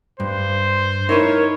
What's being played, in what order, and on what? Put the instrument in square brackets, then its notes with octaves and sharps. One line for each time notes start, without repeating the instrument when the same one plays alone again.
[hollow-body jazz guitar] G2 [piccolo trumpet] C5
[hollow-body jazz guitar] D#4 E4 B4 [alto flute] A#4 [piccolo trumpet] C#5